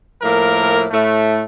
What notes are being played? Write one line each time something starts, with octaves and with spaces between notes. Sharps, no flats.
A2 F3 A#3 A#4
A2 A3